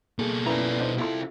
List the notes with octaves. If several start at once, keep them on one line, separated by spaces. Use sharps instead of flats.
B2 A#3 G#4 A4
F#2 A#3 E4 B4 D5 A#5
D4 D#4 C5
C3 E4 F4 A4 C6